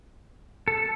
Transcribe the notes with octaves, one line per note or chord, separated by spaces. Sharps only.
A4